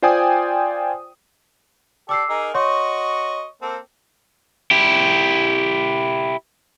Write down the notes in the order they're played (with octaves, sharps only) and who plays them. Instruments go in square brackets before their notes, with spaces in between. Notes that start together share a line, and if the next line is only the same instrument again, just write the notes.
[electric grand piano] F4 C5 D5 G5 G#5 D#6
[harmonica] G4 A4 D5 [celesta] D6 E6 C7
[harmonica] D#4 G#4 A#4
[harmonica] F#4 D#5 C#6 [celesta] C#5 C6
[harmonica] A#3 C4 A4
[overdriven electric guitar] E4 G4